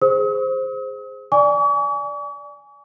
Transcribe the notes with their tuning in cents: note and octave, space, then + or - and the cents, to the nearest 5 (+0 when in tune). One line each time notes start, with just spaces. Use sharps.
G#4 +0 C5 +0 D#6 +45
D5 +0 G#5 +0 C#6 +45